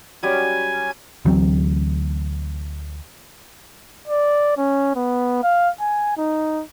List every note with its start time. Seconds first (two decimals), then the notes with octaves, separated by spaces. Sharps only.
0.23 F#3 G3 C#4 G#5 G#6
1.25 D2 E3 F#3 C4
4.08 D5
4.57 C#4
4.96 B3
5.43 F5
5.80 G#5
6.17 D#4